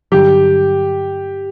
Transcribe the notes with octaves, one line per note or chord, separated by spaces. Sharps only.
G2 D3 F#3 G4